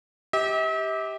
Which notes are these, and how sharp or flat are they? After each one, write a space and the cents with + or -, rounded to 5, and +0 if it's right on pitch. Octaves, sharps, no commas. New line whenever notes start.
G4 +0 E5 -45